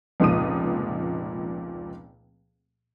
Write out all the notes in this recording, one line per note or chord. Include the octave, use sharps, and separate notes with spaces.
F1 C#2 A#2 F3 D#6 D#7